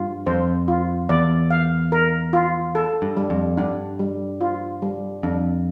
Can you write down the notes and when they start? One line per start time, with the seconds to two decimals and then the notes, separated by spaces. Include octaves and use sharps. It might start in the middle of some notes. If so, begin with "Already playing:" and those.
Already playing: G2 F4
0.27 F2 C5
0.68 F4
1.09 E2 D5
1.51 F5
1.92 A#4
2.33 F4
2.75 A4
3.02 G2
3.17 G3
3.30 F2
3.57 G2 D4
3.99 G3
4.41 F4
4.82 G3
5.23 F2 D4